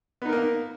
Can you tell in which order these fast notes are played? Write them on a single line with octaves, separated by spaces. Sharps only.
B3 D#4 A#4 A#3